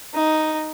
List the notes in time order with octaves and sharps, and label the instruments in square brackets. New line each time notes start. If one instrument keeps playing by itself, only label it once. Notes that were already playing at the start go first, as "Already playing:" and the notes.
[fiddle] D#4